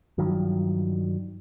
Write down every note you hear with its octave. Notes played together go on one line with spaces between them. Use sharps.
G2 D#3 F3 F#3